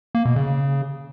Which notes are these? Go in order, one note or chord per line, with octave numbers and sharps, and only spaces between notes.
A#3
B2
C#3